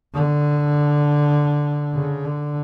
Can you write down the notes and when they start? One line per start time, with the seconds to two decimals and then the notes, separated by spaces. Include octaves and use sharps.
0.14 D3
1.95 C#3
2.25 D3